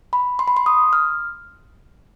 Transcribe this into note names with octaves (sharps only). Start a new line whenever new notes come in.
B5
C6
B5
C6
D#6
F6